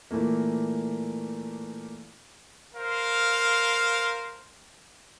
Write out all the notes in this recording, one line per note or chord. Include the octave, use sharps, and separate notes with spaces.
A#2 E3 A3 A#3
A#4 C5 F5